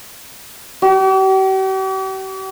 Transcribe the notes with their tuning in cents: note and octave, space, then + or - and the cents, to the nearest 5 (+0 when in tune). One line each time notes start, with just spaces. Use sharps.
G4 -45